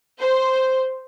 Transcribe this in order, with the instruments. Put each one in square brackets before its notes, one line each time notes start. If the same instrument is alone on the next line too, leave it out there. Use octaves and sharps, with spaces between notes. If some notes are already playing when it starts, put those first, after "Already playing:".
[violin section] C5